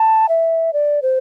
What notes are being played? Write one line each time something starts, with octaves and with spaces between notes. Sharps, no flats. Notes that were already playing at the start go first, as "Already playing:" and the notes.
Already playing: A5
E5
D5
C5